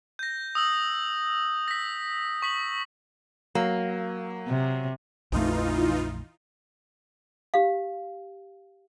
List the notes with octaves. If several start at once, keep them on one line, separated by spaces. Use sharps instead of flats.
G6 A#6
D#6 E6 F#7
A#6 B6
C#6 B6 F#7
F#3 A#3
C3
A#1 F2 E3 A3 D#4 F4
G4 F5